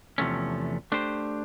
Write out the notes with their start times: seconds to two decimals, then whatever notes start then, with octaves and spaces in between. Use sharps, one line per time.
0.18 E2 C3 F3 A3 C#4
0.92 A3 D4 G4 C5